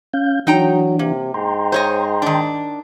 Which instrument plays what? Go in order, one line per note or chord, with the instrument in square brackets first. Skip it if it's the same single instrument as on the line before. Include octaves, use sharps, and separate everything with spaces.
[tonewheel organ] C#4 F5 G6
[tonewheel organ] E3 D4 [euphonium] F#3 [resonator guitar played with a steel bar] D#4 G5 A#5
[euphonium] C3 [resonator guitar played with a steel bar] A#3
[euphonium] G#2 [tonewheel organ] G5 A#5 C6
[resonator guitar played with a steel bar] C5 C#5 D#5
D#3 D4